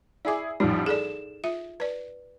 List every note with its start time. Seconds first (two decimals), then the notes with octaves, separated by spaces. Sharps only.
0.25 E4 G#4 D5 D6
0.60 A1 F3 G3 D#4
0.86 G#4 A4 D5 E7
1.44 F4 E5
1.80 B4 D5